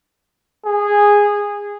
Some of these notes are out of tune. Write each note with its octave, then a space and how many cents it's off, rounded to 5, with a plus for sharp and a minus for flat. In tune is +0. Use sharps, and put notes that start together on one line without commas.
G#4 -15